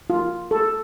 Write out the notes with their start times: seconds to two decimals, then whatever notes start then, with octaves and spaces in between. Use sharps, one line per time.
0.10 F4
0.51 A4